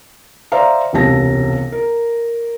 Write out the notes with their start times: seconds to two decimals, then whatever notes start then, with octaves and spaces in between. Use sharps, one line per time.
0.52 C5 D5 E5 F5 A#5
0.93 E1 C#2 C3 A5 A#6
1.72 A#4